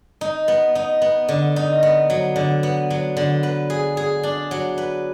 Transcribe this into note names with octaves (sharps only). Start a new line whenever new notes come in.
D#4
B3
D#4
B3
D3
D#4
B3
F#3
D3
B3
F#3
D3
B4
G#4
G#4
D4
F#3
B4